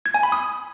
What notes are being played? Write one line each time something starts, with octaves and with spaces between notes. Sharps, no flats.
G#6
G#5
B5
D#6